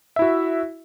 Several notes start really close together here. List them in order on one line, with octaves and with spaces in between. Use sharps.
E5 E4 F#4